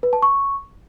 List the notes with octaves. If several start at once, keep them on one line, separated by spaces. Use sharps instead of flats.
B4
A5
C#6